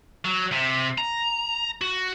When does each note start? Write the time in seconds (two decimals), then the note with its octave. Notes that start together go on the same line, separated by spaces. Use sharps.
0.25 F#3
0.52 C3
0.98 A#5
1.81 F#4